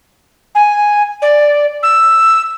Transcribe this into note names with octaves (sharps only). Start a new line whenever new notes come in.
G#5
D5
E6